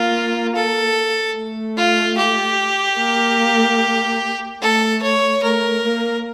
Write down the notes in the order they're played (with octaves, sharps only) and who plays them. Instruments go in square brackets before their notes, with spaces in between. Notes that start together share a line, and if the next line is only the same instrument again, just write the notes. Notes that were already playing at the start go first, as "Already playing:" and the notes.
Already playing: [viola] A#3 [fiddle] F4
[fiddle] A4
[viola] A3
[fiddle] F4
G4
[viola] A#3
[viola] A3 [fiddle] A4
[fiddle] C#5
[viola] A3 [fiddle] A#4
[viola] A#3